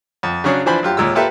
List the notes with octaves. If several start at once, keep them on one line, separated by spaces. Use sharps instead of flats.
F2
C#3 F#3 C#4 D4 G#4
E3 F3 D4 C5 G#5 B5
F#2 F4 G4
D#2 A#2 G#3 E6
A#3 F4 G4 A4 B4 E5